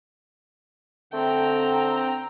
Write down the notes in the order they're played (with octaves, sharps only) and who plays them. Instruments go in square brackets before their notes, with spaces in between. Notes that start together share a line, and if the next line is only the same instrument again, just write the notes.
[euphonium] D3 [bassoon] A3 [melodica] C4 [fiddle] G5 A#5